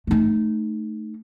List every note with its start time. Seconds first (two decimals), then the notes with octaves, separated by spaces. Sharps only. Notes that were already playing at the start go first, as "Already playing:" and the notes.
0.07 A3 D#4